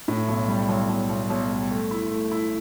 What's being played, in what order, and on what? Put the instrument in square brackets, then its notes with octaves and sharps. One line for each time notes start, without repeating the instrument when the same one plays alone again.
[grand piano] A2
B1
G3
B1
B1
B1
B1
G3
A3
E4
A3
E4